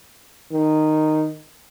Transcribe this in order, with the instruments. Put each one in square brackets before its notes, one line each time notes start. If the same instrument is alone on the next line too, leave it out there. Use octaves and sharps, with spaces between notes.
[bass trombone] D#3